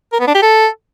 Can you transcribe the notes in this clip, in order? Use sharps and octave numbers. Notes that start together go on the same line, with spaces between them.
A#4
B3
D4
G4
A4